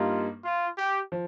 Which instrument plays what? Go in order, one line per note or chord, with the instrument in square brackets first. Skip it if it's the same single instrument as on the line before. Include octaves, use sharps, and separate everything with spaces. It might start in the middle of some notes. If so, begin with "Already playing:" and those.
Already playing: [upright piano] G2 G3 A#3 D#4 [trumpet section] F4
[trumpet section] F4
G4
[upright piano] F3